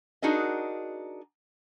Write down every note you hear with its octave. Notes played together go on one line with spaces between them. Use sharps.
D4 D#4 F#4 G#4 A#4 D#5